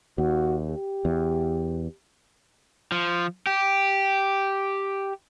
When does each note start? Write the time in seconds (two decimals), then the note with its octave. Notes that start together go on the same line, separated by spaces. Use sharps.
0.18 D#2 F#4
0.70 G4
1.05 E2
2.92 F3
3.47 G4